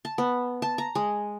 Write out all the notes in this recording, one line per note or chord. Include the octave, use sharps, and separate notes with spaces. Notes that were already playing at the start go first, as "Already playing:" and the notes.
A5
B3
A5
A#5
G#3